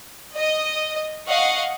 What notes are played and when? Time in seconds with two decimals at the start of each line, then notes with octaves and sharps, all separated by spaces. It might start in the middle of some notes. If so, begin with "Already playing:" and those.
0.36 D#5
1.27 D#5 F5 F#5 C#6